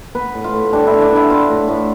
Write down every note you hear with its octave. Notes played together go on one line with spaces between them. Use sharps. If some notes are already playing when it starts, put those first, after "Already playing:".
B3 B4
A2
F4
A2
G3 D4
E4
B3
D4
B3 E4
B3 F4
A2
A2